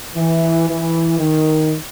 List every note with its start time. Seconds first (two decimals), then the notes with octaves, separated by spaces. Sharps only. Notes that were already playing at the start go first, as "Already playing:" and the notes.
0.15 E3
0.68 E3
1.19 D#3